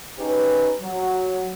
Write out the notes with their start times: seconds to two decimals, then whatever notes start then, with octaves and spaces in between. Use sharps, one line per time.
0.19 C#4 D#4 G4 G#4 B4
0.81 F#3